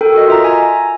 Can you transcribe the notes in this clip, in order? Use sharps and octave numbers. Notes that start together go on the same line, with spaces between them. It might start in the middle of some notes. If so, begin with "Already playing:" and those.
A4 A#4 G5
F#4 D#5
F4 E5 A#5
E5 G#5 A#5